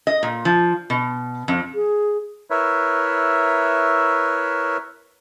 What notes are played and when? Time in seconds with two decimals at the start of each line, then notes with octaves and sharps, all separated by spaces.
0.07 D#5
0.23 A#2
0.45 F3
0.90 B2
1.48 F2
1.74 G#4
2.50 E4 A#4 B4 C#5 E5